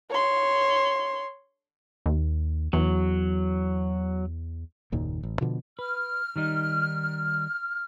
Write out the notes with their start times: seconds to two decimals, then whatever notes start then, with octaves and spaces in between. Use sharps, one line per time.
0.10 C#5 C6
2.06 D#2
2.73 E2 F#3
4.92 F#1 D#2 A#2 D#3
5.23 A1
5.41 B2 D3 F3
5.79 B4 F6
6.36 D#3 G3 D#4